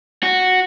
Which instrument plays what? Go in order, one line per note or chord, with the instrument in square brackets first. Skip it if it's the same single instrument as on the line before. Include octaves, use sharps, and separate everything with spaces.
[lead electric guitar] F#4